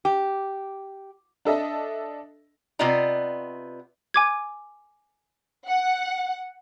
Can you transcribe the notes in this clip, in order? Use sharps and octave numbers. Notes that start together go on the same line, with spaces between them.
G4
D4 A4 D#5 E5
C3 B3 F4 D5 D#5 A#5
G#5 D6 G#6
F#5